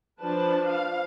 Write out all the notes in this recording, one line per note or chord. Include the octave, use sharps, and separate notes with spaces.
F3 D4 B4 A5
F5